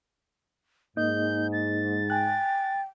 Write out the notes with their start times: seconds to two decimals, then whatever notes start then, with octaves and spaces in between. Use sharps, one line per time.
0.97 G#2 A#3 D#4 D#5 G6
1.53 A6
2.10 G5 G#5 F#6